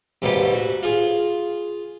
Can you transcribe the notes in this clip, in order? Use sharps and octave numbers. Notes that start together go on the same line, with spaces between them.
D#2 G#2 B2 G3 A3
F#4
F4 G#4